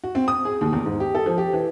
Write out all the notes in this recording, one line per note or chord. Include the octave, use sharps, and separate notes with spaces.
F#4
C4
D#6
G#4
D#2
E2
G#2
G4
A4
F3
G4
E3